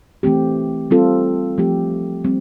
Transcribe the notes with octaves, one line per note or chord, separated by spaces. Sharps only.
E3 A3 C4 G4
G3 C4 F4 A4
F3 A3 C4 G4
G3 C4